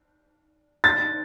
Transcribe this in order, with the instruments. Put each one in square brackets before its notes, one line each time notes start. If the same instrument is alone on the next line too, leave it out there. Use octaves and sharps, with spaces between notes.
[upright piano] A6